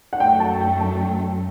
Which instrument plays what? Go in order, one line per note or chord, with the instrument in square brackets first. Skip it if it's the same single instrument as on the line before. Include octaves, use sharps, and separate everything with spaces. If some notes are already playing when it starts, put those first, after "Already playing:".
[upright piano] F#5
[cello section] F#2 F#3 A3 [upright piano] G5
[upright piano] A5
G5
A5
G5
G5